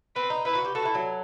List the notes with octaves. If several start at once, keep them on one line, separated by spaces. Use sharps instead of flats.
C4 B4
D#4
E4 B4
F#4
G4
F#4 A4
E4
F#3